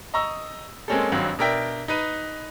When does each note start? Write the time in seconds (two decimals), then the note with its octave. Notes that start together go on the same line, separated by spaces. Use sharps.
0.14 D#5 A#5 C#6 D#6 E6
0.88 G#3 A#3 C4 C#4 G#4 A4
1.12 G#1 G2 F#3 C4 F5
1.39 B2 D4 A#4 E5 G5 B6
1.88 D#4 B4 D#7